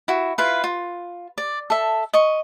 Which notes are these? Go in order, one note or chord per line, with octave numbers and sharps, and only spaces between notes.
E4 F#4
E4 F4 B4 F5
F4
D5
A4 E5
D#5 C#6